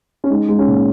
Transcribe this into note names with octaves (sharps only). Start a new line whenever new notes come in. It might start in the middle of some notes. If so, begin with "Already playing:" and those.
C#4
G#3 D#4
G#3
C#4
A#2